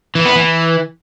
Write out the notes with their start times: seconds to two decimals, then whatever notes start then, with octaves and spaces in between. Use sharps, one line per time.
0.15 E3
0.25 B3
0.35 E3